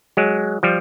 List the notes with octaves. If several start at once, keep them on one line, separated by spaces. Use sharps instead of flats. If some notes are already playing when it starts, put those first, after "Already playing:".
F#3 G#3
F3 G3